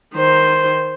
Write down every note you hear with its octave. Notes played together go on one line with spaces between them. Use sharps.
D#3 C5